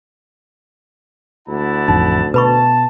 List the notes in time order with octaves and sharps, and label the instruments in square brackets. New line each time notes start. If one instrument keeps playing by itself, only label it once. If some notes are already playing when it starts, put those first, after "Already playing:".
[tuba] D2 [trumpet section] E4 F#5 A5
[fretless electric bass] A1 F2 [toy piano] D#4
[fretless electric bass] B2 [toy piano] B4 B5 C#6 [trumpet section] A5